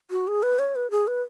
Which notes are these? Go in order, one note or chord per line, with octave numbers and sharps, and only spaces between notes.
F#4
G#4
B4
C#5
B4
G#4
B4